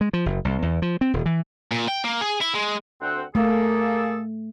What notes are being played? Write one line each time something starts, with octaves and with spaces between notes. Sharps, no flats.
G#3
F3
F#1
C2
E2
F3
C4
D#1
E3
A#2
G5
A#3
G#4
E4
G#3
D2 C4 F#5
A3 A#3 G#4 A4